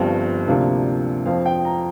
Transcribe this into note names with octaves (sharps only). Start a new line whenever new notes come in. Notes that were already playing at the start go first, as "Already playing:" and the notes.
Already playing: G1 G2 F3 C4 G5
D2 C3 F3 A#3 D4
F2 F3 C4 F5
G5
A#5